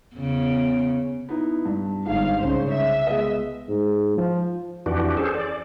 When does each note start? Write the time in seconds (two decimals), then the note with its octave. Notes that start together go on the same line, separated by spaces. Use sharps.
0.16 E2 C#3
1.29 B3 D#4 E4
1.66 G2
2.06 G1 G#2 F5
2.39 C2 C#3 C5
2.71 E5
3.07 G#3 B3 D#5
3.69 G#2
4.17 F3
4.86 F2 E3 D4 F#4 G4
5.17 C#4 G#4 A4 C5
5.35 D5